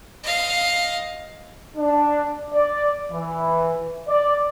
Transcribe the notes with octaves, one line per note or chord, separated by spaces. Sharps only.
D#5 F5
D4
D5
E3
D5